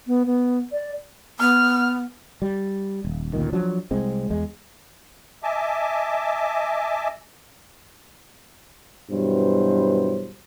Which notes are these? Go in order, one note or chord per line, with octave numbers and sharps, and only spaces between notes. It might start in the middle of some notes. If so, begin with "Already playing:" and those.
B3
B3
D5
B3 F6
G3
D#1
A1 D2 A#2 D#3
F3 F#3 D4
C2 G#3 C4
E2 G#3
D#5 E5 G#5 A5 D6
G2 B2 E3 F#3 C5